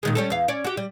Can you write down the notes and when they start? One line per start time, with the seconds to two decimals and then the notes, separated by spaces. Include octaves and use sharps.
0.03 A#2 D#3 G#3
0.15 G3 C#4 A4
0.30 E2 F5
0.48 C#4 D5
0.64 F#4 G4
0.77 G3